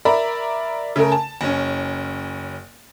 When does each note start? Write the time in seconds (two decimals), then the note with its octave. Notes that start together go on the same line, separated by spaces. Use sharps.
0.05 A#4 D5 E5 A#5 B5
0.96 C#3 A3 A4 A#4
1.12 A5
1.41 F#1 C#4